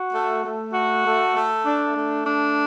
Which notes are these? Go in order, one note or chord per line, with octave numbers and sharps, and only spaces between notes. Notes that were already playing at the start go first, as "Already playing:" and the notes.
Already playing: F#4
A3
A3
F#4
A3
A3
D4
A3
D4